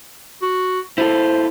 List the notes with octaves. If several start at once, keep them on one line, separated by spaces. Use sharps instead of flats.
F#4
E4 F4 A4 C5